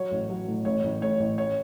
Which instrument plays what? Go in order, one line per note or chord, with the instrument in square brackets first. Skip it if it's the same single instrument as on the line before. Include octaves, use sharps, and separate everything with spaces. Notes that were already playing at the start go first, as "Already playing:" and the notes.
Already playing: [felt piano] F#3 C#5
A1
F#3
A2
A1 C#5
A1
A2 C#5
A1
C#5